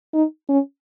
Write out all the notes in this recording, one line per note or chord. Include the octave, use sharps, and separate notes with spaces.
D#4
C#4